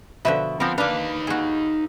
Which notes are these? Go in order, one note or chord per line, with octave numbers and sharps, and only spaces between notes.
B2 D3 F3 B4 E5
F3 B3 C4 A#4
A#3 D4 D#4 B4 F5
F#4 G#4